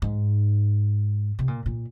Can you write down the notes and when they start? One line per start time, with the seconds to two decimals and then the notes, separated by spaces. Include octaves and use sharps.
0.02 G#2
1.39 C3
1.48 A#2
1.66 A#2